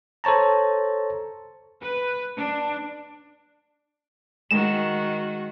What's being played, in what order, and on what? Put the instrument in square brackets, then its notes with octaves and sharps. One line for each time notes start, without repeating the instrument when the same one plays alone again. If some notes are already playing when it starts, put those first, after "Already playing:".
[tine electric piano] A4 C5 C#5 A5 A#5
[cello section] B4
D4
[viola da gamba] D#3 F#4 [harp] G#3 [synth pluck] E7